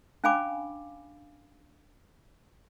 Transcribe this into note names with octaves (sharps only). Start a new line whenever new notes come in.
C#4 D4 F5 G#5 B5 D6